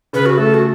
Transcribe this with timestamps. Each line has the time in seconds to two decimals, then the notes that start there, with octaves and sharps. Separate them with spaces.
0.13 C#3 B4
0.26 F#4
0.37 A3 A4
0.54 F#4